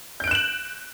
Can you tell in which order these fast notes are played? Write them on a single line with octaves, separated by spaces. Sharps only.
G6 D7 F#6 E7 F#7